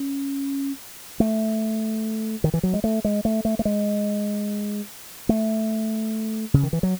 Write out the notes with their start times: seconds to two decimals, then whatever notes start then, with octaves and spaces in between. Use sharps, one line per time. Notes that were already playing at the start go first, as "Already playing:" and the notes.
Already playing: C#4
1.20 A3
2.44 D#3
2.54 E3
2.63 F#3
2.74 G#3
2.84 A3
3.05 G#3
3.25 A3
3.45 A3
3.59 A3
3.65 G#3
5.29 A3
6.54 C#3
6.63 D#3
6.73 E3
6.83 F#3